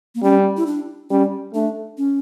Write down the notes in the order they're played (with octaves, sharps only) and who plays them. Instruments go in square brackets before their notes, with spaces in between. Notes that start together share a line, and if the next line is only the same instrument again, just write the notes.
[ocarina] A#3
[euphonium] G3 [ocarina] C#4
[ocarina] E4
D4
[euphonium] G3 [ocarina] C#4
[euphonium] A3 [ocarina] D4
[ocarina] C#4